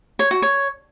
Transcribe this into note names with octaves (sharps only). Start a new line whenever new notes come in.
C#5
F#4
C#5